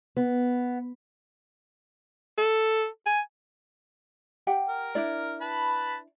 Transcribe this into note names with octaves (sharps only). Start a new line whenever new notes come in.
B3
A4
G#5
G4 F#5 G5
A#4
D4 E4 D5
B4 A5 B5